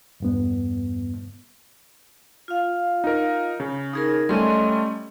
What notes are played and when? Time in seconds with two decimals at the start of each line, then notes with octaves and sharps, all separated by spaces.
0.20 E2 G2 B3
2.48 F4 F5
3.04 D#4 A#4
3.60 C#3
3.93 D#4 G#4 A#4
4.29 G3 A3 C#4 D#5 C6